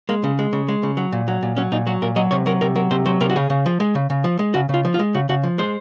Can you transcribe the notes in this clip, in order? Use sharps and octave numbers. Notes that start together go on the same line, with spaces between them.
G#3 A#3
C#3
G#3
C#3
G#3
C#3
F#3
A#2
F#3
A#2
F#3 C#4
A#2 D#4
F#3 F#4
A#2 A#4
F#3 D#5
C3 C#5
F#3 A#4
C3 A#4
F#3 A#4
C3 C5
F#3 C5
C3 A#4
F#4
C#3 G#4
C#3
F3
G#3
C#3
C#3
F3
G#3
C#3 F#4
C#3 F4
F3
F4
G#3
C#3 F#4
C#3 F#4
F3
G#3 C5